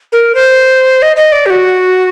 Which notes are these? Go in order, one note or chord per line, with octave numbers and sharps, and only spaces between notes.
A#4
C5
D#5
D#5
D5
G4
F#4